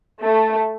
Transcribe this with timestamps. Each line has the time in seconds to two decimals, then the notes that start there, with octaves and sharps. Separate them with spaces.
0.24 A3